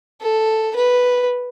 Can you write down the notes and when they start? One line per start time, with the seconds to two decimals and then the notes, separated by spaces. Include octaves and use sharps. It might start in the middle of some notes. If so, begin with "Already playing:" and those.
0.21 A4
0.76 B4